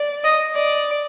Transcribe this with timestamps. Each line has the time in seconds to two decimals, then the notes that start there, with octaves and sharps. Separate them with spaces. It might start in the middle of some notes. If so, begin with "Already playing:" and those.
Already playing: D5
0.24 D#5
0.55 D5 D#5